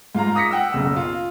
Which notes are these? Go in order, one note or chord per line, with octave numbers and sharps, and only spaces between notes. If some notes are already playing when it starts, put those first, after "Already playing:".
G#2 F4 F5 A#5
D6 D#6 A#6 B6 C#7
F#5 G5 E6
F#1 B1 C#3 E6
F4